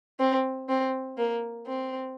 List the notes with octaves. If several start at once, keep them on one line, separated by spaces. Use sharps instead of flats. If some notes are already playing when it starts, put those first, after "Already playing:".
C4
C4
A#3
C4